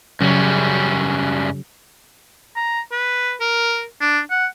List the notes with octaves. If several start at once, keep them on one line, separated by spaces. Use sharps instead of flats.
F#2 C#3 F#3 G3 C#4
A#5
B4
A#4
D4
F#5